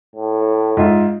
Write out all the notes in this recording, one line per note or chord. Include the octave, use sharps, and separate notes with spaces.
A2
G#2 F4 E5